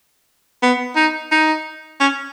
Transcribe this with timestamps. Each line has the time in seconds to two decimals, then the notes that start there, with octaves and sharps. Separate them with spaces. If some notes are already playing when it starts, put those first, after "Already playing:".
0.62 B3
0.96 D#4
1.32 D#4
2.00 C#4